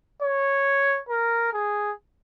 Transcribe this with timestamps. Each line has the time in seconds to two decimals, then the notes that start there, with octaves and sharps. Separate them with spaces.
0.22 C#5
1.09 A#4
1.53 G#4